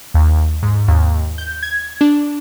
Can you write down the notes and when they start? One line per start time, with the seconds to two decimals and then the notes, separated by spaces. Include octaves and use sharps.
0.14 D#2
0.63 G#2
0.88 D#2
1.38 G6
1.63 G#6
2.01 D4